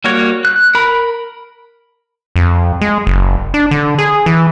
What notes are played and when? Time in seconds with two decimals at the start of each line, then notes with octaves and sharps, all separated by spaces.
0.04 G3 A#3 F#4 C#5
0.45 F#6
0.75 A#4 B5
2.36 F2
2.81 G#3
3.07 F#1
3.54 D4
3.71 D3
3.98 G#4
4.26 E3